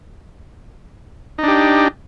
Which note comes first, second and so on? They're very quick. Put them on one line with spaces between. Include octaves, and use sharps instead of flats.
D#4 D4 G4